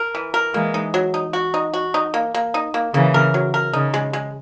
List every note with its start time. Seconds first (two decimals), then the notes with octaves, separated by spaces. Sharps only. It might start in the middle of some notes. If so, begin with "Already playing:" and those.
Already playing: A#4
0.15 E3
0.34 A#4
0.54 E3 G#3 A#3
0.74 D#4
0.94 F#3
1.14 D#4
1.33 F#4
1.54 D#4
1.74 F#4
1.94 D#4
2.14 A#3
2.34 A#3
2.54 D#4
2.74 A#3
2.94 C#3 E3 A#3
3.14 A#4
3.34 F#3
3.54 A#4
3.73 C#3 D#4
3.94 G#3
4.13 G#3